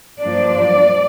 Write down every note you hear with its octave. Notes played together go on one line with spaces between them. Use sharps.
G2 F3 A#3 D4 D5